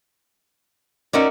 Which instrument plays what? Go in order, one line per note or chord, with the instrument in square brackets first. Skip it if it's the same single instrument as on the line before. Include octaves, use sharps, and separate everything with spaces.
[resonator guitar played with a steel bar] C#4 D#4 D5 [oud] F#4 A#4 E5